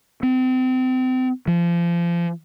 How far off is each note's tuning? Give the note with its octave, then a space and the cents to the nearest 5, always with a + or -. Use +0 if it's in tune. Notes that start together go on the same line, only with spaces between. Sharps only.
C4 -30
F3 -30